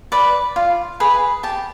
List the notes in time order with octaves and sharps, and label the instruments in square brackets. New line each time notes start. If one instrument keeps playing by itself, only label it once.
[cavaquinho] B4 D5
F4
G#4 B4
G4 A5